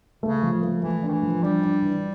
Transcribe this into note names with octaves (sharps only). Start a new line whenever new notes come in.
C#3 A3
F3
A3
E3 A3
D4
D#3
E3
F3
G3 D4
D4
E3